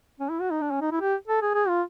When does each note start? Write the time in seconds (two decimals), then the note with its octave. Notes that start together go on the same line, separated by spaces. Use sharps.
0.20 C#4
0.30 E4
0.41 F#4
0.51 D#4
0.61 D4
0.71 C#4
0.81 D#4
0.91 E4
1.01 G4
1.28 A4
1.41 G#4
1.54 G#4
1.68 F4